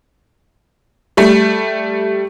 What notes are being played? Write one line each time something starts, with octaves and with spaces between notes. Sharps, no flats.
G3 A3